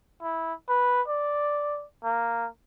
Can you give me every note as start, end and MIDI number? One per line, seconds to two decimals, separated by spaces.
0.22 0.53 64
0.69 1.01 71
1.08 1.84 74
2.04 2.47 58